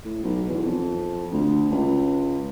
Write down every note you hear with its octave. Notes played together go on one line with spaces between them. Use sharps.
A2
B1
E2
F2
D2
C#2